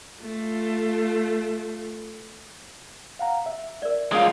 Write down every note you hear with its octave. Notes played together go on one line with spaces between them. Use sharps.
A3 F4
F5 F#5 A#5
E5
A#4 D5
G#3 F4